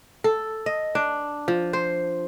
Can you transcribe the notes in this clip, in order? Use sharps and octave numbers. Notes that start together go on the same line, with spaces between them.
A4
D#5
D4
F3
C5